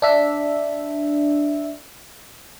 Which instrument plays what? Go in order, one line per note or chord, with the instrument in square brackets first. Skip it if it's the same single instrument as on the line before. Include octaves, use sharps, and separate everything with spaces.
[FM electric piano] D4 E5